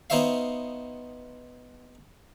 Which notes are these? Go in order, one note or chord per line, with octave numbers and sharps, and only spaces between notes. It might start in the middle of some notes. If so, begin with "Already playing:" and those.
B3 D#4 C5 C#5 E5 F5